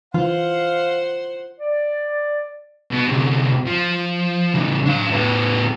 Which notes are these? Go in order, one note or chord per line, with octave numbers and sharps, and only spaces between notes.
E3 F4 C5 F5 F#5
D5
B2
D2 C3
F3
E2 C#3
D4 F5
A2 B3